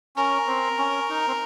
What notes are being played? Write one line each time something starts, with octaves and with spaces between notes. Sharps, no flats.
C#4 A#4
C4
C#4
D#4
C4